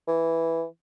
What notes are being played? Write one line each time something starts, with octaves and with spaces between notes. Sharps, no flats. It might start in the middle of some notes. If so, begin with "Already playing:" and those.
E3